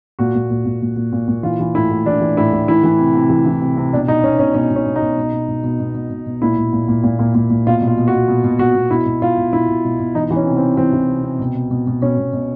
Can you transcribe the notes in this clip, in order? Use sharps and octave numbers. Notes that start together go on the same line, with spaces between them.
A#2 F#4
A#2
A#2
A#2
A#2
A#2
A#2
A#2
E3 F4
E3
A2 E4
A2
E3 D4
E3
A2 E4
A2
E3 E4
E3
C3
C3
E3
E3
C3
C3
B2 D4
B2 D#4
B2 C#4
B2 C#4
B2 C#4
B2
C#4
B2
D#4
B2
B2
B2
B2
B2
B2
B2
B2
B2
A#2 E4
A#2
A#2
A#2
A#2
A#2
A#2
A#2
B2 F4
B2
F4
B2
F#4
B2
B2
B2
B2 F#4
B2
B2 E4
B2
B2 F4
B2
B2 E4
B2
B2
B2
E3 D#4
E3
C#4
C3
C4
C3
E3 C4
E3
C3
C3
B2
B2
B2
B2
B2 C#4
B2
B2